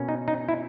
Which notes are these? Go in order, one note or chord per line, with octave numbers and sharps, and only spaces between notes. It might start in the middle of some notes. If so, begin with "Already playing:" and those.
Already playing: B2 A#3 C#4
D#4
D#4
E4